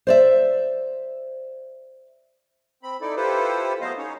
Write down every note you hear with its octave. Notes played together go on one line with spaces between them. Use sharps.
C5 D5 E5
C4 B5
D#4 E4 A4 D5
E4 F4 G4 A4 B4 C5
F#3 A3 B3 C5 D#5 F5
C#4 D#4 C#5